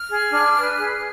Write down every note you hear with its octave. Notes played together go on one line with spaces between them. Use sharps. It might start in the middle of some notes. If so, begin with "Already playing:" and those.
Already playing: F6
G#4
D4
B4
G#4